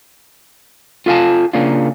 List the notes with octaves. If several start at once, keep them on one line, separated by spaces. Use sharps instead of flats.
F4 A4 F5 G#5 A5
C#3 A#3 C#4 D4 F4